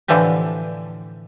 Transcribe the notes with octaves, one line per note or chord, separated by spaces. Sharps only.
A2 D3 E3 F3 G4